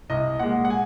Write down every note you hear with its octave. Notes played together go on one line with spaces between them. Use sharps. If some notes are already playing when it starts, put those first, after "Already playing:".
C2 D#5
A#2 G#3 F#5
F#5
G#5